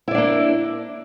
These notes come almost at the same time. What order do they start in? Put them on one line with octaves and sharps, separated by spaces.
E4 D5 D4 A#3